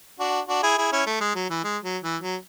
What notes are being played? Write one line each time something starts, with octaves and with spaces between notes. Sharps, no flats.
D4 F#4
D4 F#4
E4 G#4
E4 G#4
C#4 E4
A3
G#3
F#3
E3
G#3
F#3
E3
F#3